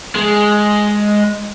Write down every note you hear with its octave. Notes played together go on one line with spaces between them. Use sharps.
G#3